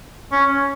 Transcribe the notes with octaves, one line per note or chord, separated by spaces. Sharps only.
C#4